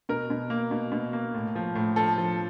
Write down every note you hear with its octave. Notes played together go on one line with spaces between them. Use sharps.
B2 A#4
B2
A#3
B2
B2
A#3
A2
F3
A2
F3 A4
F3